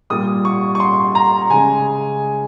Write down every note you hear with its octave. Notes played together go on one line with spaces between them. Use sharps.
A#2 G3 A#3 D#6
C#6
C#6
C6
A#5
C#3 G#3 G#5